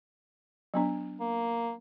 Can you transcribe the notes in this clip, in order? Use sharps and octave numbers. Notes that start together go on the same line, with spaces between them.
F#3 B3 D4
A#3